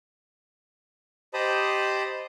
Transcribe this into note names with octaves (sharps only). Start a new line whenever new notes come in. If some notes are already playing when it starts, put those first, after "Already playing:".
G4 C5 D#5 A5 B5 D#6